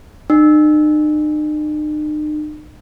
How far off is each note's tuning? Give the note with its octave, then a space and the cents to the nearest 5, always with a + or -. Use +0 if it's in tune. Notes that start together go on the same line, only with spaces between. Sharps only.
D#4 -45